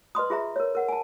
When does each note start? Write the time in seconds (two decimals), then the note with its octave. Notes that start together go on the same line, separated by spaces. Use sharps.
0.15 B4 D#5 C6 D#6
0.30 F4 G#4 E5 A#5
0.56 A#4 C#5
0.75 A#4 F#5
0.88 G#5 A5